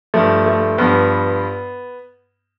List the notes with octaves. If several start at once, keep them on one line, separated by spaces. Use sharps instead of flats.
G2 F3 A3
A3
G2 F3 B3